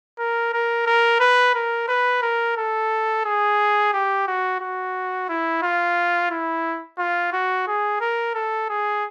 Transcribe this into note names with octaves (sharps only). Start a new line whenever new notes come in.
A#4
A#4
A#4
B4
A#4
B4
A#4
A4
G#4
G4
F#4
F#4
E4
F4
E4
F4
F#4
G#4
A#4
A4
G#4